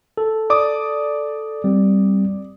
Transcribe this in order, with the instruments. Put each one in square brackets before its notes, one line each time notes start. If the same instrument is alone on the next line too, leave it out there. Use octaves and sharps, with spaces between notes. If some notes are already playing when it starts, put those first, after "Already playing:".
[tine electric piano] A4
[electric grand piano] D5 D6 D#6
[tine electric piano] G3 C4